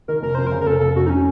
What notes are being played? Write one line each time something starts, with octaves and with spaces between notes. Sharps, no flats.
D#3 A#4
F1 A#4
F2 C5
A#4
C#3
A#4
F1 A4
F1 A4
F2 F#4
D#4
C#4